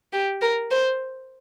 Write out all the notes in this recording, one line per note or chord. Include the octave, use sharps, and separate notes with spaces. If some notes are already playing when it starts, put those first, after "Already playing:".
G4
A#4
C5